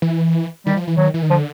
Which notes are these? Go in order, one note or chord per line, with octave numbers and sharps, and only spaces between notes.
E3
D#3 G3
F3
E3
D#3 F#3
E3
D#3
D3 F3